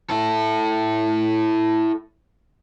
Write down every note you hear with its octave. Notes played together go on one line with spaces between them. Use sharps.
E4 A4